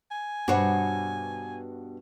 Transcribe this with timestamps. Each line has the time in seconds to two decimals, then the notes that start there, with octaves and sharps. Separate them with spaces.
0.11 G#5
0.48 G2 B2 D4 F#4 C5 C#5 F#5